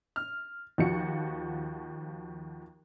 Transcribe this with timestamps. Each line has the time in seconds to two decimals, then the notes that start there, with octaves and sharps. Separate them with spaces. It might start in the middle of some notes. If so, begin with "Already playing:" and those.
0.16 F6
0.78 D#2 F3 F#4 C#7